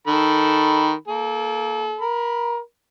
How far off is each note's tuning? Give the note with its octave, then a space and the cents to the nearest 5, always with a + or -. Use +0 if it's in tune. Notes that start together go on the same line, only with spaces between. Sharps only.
D#3 -5 A4 +0 B5 +0
A#3 +0 A4 -35
A#4 +20 B5 +0